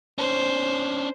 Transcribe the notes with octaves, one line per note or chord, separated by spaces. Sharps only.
C#4 D4 C5